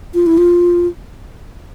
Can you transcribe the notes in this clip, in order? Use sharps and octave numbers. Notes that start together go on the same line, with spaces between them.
F4
E4
F4